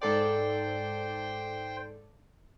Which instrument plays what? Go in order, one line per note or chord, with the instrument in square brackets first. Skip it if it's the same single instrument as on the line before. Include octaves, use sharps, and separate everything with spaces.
[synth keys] G#2 A4 D5 [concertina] C5 G5